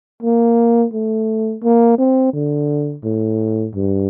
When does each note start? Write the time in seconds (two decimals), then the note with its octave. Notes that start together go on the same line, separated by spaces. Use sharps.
0.23 A#3
0.93 A3
1.63 A#3
1.99 C4
2.33 D3
3.04 A2
3.75 G2